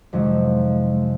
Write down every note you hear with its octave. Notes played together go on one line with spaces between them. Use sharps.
F2 C3 D#3 F#3 G#3